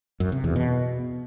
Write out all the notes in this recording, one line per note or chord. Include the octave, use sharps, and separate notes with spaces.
F#2
C3
E2
B2